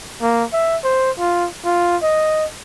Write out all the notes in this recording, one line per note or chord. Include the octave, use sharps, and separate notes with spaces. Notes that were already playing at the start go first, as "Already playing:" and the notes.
A#3
E5
C5
F4
F4
D#5